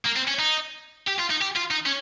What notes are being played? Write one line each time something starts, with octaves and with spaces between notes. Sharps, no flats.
A#3
C4
C#4
D#4
G4
F4
D#4
G4
F4
D#4
C#4